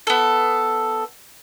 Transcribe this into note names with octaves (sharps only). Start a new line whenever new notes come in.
B3 A4